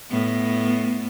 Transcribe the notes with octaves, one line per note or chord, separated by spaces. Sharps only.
A2 B3